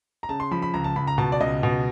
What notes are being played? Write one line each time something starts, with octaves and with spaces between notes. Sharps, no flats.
A#5
C#3 A5
C6
F3 B5
B5
C#2 A#5
A5
C#2 B5
A#5
B2 A5
D5
C#2 D#5
B2